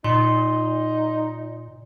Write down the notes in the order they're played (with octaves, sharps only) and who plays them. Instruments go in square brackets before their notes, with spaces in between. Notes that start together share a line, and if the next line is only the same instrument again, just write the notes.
[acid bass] A#2 [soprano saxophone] D#4 [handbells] C6